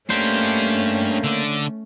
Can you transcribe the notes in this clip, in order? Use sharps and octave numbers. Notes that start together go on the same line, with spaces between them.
A3 A#3 C#4 D4 G4 C5
D3 D5